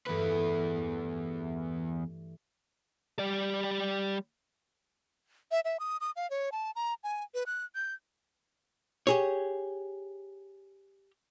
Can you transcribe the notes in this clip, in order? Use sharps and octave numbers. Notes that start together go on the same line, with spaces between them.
E2 G2 E3 A3 B4
G3 D5
E5
E5
D#6
D#6
F5
C#5
A5
A#5
G#5
B4
F#6
G6
G4 G#4 C#5